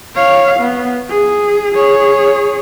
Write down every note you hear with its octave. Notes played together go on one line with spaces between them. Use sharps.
C#5 F5
B3
G#4
G#4 C#5